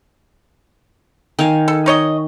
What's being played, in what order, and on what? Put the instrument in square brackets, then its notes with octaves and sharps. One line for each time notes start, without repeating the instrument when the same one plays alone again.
[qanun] D#3 F5 G#5
[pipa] A4
D#4 C#5 D#5